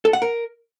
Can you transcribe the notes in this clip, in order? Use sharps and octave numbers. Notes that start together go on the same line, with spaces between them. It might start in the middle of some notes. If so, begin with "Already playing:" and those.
A4
F#5
A#4